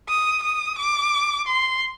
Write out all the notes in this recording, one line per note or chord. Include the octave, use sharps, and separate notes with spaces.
D#6
D#6
D6
C6